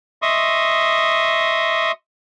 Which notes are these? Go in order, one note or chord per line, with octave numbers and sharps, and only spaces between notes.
D#5 E5 C6 C#6 D#6